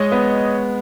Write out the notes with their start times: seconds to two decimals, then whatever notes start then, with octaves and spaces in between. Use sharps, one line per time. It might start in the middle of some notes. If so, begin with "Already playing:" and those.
Already playing: G#3 C#5 D#5
0.12 B3